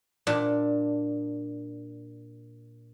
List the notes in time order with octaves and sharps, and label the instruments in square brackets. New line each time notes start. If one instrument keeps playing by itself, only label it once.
[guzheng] A#2 D4